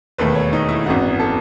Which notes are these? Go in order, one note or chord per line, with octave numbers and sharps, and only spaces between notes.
E1 D#2 D#3 A3 B4
C#5
D#4
E4
G#1 F#2 E3 B3 D#4 F#4
A4